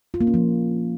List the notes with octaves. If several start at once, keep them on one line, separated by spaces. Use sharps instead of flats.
F4
A#3
C#4
F3